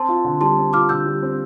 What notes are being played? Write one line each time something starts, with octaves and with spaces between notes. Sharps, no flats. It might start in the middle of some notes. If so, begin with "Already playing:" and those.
Already playing: C4 A5 C6
F4
D3
G3 A5 C6
C4
F4 D6 F6
D3 E6 G6
G3
C4